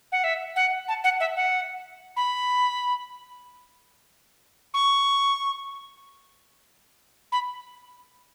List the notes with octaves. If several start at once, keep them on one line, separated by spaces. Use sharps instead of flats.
F#5
E5
F#5
A5
F#5
E5
F#5
B5
C#6
B5